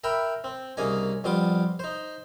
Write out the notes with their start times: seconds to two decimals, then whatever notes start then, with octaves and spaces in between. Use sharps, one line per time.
0.04 A#4 E5 G5 B5
0.44 C4
0.77 C2 C#3 A#3 D#4 G#5
1.24 F2 G3 B3 F4 D6
1.79 D#4 C5